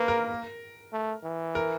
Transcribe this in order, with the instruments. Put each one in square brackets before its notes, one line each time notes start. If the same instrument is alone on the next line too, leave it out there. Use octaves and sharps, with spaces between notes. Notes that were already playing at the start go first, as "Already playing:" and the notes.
Already playing: [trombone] A#3 [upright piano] B4
[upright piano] A#4
[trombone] A3
E3
[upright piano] A#4